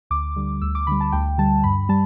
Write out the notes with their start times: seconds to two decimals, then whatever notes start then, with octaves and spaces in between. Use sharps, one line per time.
0.10 D2 D6
0.36 D3 G3
0.62 D2 E6
0.75 D6
0.87 D3 G3 B5
1.01 A5
1.12 D2 G5
1.38 D3 G3 A5
1.64 G2 B5
1.89 G3 A5